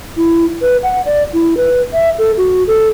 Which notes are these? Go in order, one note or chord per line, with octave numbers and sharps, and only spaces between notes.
E4
B4
F#5
D5
E4
B4
E5
A4
F#4
A4